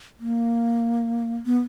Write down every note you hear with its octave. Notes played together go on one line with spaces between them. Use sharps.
A#3
B3